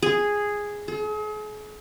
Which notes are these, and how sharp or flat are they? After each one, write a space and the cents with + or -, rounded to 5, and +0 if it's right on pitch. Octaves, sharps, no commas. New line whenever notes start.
G#4 -5
G#4 +40